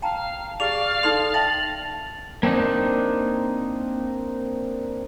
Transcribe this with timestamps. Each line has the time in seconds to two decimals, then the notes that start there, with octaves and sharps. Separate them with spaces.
0.02 F5 G5 A5 A#5
0.60 G4 G#4 D5 F5 D6 F7
1.03 D#4 A4 C6 F7
1.34 E5 G5 A5 A6 F#7
2.43 A#3 C4 D4 D#4